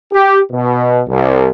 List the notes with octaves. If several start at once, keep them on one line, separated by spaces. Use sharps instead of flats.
G4
B2
C2